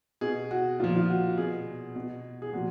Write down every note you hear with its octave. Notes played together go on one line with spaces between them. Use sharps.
B2 G#4
F#4
A#2 F3 F4
F4
F#4
B2 G#4
B2
G#4
A#2 F3 F#4